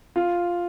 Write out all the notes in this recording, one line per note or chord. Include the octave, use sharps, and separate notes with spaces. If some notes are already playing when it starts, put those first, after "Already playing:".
F4